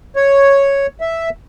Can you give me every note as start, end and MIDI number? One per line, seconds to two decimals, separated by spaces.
0.16 0.87 73
1.01 1.30 76